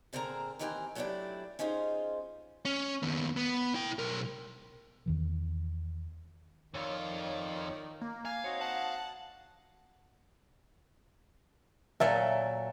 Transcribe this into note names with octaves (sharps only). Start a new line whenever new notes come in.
A#2 D3 C4 G#4 A#4 A#5
D#2 E3 C4 G4 A#4 G#5
F#3 A3 D4 E4 G4 D5
C#4 D#4 F4 G#4 C5
C#4
D#2 B3
B3
E4 G5
B1 A#4
E2 D#3 E3
F2 D#3 F4 C#5 D5
A#3
F5 G#5
C4 D#4 F#4 C#5
F#5 A5
A#2 F#3 A4 A#4 E5 G#5